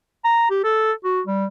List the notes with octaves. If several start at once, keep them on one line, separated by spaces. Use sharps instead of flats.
A#5
G4
A4
F#4
G3